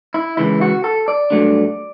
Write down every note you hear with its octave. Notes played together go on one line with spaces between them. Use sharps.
E4
C#2 C#3 E3 E4
F#4
A4
D5
G2 F#3 A3 D4